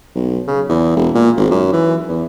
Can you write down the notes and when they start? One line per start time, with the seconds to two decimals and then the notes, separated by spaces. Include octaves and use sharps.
0.15 B1
0.47 C#3
0.69 E2
0.96 E1
1.15 A#2
1.36 G#1
1.51 F#2
1.72 E3
2.08 E2